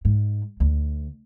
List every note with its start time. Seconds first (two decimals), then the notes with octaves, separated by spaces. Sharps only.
0.05 G#2
0.60 D2